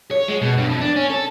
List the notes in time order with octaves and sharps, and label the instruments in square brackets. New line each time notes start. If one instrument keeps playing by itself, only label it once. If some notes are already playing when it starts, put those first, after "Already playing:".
[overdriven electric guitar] C#5
G#3
B2
G2
F2
D4
C#4
A4